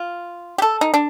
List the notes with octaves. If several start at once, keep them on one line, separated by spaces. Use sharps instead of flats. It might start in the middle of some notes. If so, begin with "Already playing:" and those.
Already playing: F4
G4
A4
D#4
D4